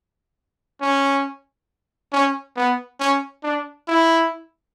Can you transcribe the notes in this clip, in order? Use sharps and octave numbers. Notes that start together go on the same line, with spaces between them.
C#4
C#4
B3
C#4
D4
E4